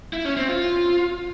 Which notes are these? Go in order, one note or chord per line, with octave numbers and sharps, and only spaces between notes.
E4
C#4
C4
F4